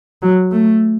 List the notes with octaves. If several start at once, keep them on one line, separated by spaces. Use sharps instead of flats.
F#3
A3